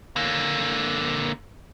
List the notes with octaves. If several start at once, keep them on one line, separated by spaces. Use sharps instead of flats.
D3 A#3